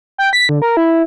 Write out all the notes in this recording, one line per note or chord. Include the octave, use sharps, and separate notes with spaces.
G5
B6
D3
A#4
E4